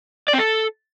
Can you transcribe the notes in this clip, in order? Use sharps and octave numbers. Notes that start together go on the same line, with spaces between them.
D5
C4
A4